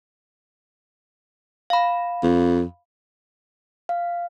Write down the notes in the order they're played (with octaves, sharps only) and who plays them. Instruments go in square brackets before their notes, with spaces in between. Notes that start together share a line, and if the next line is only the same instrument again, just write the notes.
[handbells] F5 B5
[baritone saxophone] F2
[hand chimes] F5